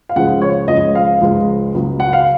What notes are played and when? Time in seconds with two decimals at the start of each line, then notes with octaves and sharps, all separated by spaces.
0.09 F5
0.15 C#2 C#3 F3 G#3 F#5
0.42 C#5
0.68 C#2 C#3 F3 G#3 D#5
0.95 F5
1.21 C#2 C#3 F3 G#3
1.74 C#2 C#3 F#3
2.00 F#5
2.13 F5